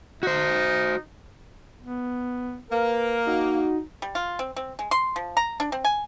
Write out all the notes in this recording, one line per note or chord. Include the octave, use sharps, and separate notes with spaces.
D#4 F#4 C5
B3
A#3 A#4 B4
D#4 F#4
G3
F4
C4
C4
G#3
C6
F3
A#5
D4
C4
G#5